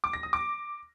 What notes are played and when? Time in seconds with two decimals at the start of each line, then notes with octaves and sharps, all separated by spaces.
0.04 D6
0.13 A#6
0.23 D#6
0.33 D6